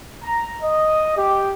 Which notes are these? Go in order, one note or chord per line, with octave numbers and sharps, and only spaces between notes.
A#5
D#5
G4